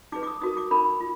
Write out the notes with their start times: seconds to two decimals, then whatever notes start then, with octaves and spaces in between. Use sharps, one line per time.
0.12 D#4 G#4 B4 D6
0.23 D6
0.27 D#6
0.42 D#4 F#4 A#4 D#6
0.57 D6
0.71 D#4 A#4 B5
1.00 F4